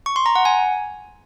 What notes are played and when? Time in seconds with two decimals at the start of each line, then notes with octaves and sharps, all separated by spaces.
0.06 C#6
0.16 C6
0.26 A#5
0.36 F#5
0.45 G#5